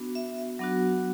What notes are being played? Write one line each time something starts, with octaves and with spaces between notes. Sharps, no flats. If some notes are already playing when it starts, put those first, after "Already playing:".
Already playing: B3 D4 F#4
E5
F#3 B3 D4 F#4